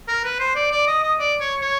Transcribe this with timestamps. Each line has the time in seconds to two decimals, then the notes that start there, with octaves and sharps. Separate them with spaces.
0.08 A#4
0.24 B4
0.40 C5
0.56 D5
0.72 D5
0.88 D#5
1.03 D#5
1.20 D5
1.40 C#5
1.62 C#5